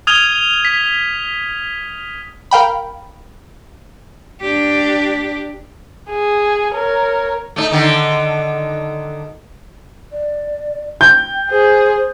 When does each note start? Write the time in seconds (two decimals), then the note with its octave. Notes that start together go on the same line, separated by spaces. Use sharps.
0.07 D#6 F6 G#6 D#7 F7 G7
0.65 B6
2.51 A#4 F5 G5 B5
4.41 D4 G4
6.10 G#4
6.73 A#4 C#5
7.56 A3 D4 D#4
7.71 D3 D#3 D#4
10.12 D5
11.01 G5 G6
11.50 G#4 C5